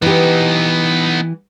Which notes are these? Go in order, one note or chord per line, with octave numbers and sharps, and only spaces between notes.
E3 B3 D#4 G4